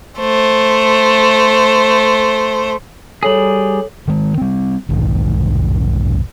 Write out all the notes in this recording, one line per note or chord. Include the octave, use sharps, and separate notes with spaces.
A3 C5
G3 G#4 A4 C#5 F#7
D#3 G#3
G3 C4
F1 B1 G#2 D#3